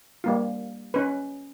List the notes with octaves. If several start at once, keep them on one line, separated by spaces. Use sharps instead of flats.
G3 A#3 F4
C#4 B4